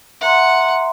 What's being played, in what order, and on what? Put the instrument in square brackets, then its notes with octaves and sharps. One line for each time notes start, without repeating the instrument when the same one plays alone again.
[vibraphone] E5 A#5 C6 [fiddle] F#5